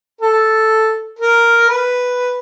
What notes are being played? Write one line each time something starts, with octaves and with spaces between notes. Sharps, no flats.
A4
A#4
B4